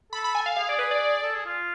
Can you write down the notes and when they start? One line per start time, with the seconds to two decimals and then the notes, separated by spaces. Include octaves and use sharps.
0.13 A4 B5
0.24 B5
0.35 G#5
0.46 F5
0.57 G#4 F5
0.69 D5
0.79 B4
0.91 D5
1.23 A4
1.34 G#4
1.46 F4